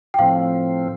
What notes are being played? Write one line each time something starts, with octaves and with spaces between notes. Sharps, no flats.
G5
A2 F3 C4 F5